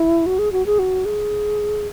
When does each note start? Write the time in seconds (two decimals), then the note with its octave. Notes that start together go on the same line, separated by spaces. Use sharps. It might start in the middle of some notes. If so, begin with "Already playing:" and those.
Already playing: E4
0.26 F#4
0.39 G#4
0.52 F#4
0.66 G#4
0.79 F#4
1.05 G#4